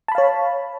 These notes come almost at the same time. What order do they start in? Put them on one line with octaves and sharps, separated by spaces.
A5 B5 F5 C#5